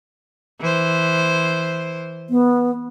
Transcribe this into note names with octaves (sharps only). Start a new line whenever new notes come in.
E3 C5
B3